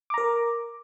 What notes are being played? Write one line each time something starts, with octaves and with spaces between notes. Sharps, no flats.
A#4 A#5 D6